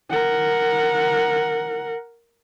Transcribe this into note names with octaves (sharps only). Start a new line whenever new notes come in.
A#4 F#5